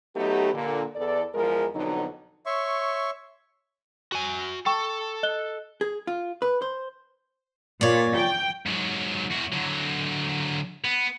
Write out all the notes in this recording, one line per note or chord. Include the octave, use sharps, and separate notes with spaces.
F#3 A3 B3 D#4 G4
A#2 D3
E2 A4 D5
E2 F3 G#3 A#4
F2 B2 D3 F#3 D#4
C#5 E5 C6 C#6
F#4 G#5
A4 G5 C#6
D#5 F#6 G7
G#4
F4
B4
C5
A#2 C#5 D5
G5
G#2 F#3
E2 F#4
D3 F#3
B3